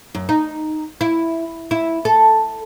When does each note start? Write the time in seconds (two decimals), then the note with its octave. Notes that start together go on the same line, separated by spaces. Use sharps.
0.15 F#2
0.29 D#4
1.01 E4
1.71 E4
2.05 A4